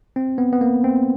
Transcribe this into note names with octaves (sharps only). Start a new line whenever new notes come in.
C4
B3
B3
A#3
C4